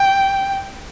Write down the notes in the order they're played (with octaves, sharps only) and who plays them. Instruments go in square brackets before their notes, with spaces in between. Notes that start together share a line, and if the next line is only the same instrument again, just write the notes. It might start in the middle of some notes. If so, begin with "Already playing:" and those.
Already playing: [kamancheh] G5